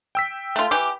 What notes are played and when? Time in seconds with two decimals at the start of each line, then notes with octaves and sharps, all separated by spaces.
0.15 G5 E6 B6
0.56 A3 F4
0.71 E3 G4 D6